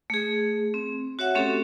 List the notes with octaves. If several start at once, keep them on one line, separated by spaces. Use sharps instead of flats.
A3 G#4
C4
F#4 C#5 E5 F#5
A3 C4 C#4 G4 A4